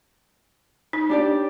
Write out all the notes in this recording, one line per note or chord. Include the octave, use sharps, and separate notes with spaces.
D#4
D4 G4 D5